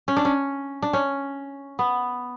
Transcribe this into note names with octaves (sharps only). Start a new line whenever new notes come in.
C#4
D4
C#4
D4
C#4
B3